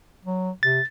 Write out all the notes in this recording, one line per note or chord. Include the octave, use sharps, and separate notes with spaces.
F#3
C3 A6